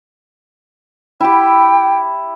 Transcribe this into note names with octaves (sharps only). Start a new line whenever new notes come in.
E4 G4 G5